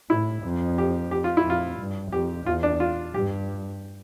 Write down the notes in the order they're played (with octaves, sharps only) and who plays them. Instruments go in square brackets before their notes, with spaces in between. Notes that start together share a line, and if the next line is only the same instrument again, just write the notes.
[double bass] A2 [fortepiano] E4
[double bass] F2
[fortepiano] G4
G4
F4
E4
[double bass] F2 [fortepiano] F4
[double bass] G2
[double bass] F2 [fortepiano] G4
[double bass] E2 [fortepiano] F4
[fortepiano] D4
F4
[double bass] G2 [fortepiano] G4